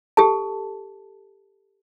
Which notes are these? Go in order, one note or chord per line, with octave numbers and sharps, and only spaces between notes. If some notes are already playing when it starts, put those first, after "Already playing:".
G4 A4 A5